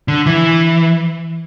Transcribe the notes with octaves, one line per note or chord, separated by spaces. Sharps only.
D3
E3